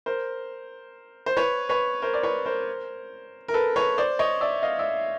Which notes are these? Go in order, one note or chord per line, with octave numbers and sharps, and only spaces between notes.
A#4 C5
C5
B4 C#5
B4 C#5
A#4 C5
D5
B4 C#5
A#4 C5
A#4
A4 B4
B4 C#5
C5 D5
C#5 D#5
D5 E5
D#5 F5
D5 E5